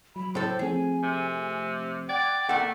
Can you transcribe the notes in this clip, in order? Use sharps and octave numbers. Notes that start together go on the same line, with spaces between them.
F#3 B5
A2 A4 C5
F3 A3 C4 G#4 G#5
C3
D5 F#5 G5 G#6
A3 A#3 D5 F#5